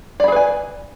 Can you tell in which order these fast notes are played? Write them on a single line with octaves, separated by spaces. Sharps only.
D5 B5 G#4 B4 G#5